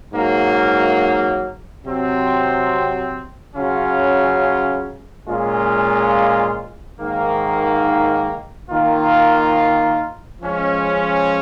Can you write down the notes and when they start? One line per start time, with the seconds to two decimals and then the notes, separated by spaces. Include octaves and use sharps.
0.13 G#2 F#3 A#3
1.85 C3 F#3 C4
3.56 C#3 F#3 C#4 F4
5.27 A#2 G#3 C#4 F4
6.99 G#2 D#3 A#3
8.70 D#3 A#3 F4
10.42 F3 G#3 C#4